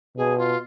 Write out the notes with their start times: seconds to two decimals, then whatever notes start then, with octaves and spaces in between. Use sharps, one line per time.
0.17 B2 G#4
0.38 F4